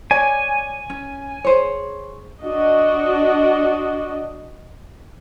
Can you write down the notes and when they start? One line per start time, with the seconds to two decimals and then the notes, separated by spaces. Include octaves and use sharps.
0.11 C#5 D5 G#5
0.90 C#4
1.44 G#4 C5 C#5
2.42 D4 F#4 D#5